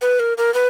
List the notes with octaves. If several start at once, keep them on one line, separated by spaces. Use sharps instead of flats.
B4
A#4
A#4
B4